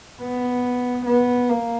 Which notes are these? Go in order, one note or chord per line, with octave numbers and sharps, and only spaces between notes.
B3
B3
A#3